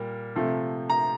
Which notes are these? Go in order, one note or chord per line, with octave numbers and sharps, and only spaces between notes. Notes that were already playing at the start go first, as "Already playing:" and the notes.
Already playing: A#2 G3 A#3
C3 F3 A3
A#5